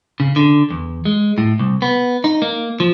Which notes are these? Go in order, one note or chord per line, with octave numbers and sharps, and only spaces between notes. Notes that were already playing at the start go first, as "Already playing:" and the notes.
C#3
D3
E2
G#3
A2
C2
B3
D#4
A#3
F3